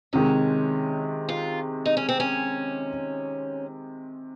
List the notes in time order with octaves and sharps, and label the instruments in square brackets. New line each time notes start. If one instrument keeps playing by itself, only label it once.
[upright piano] C3 D#3 G#3 [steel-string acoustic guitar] C#4
[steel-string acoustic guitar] F4
D#4
C#4
C4
C#4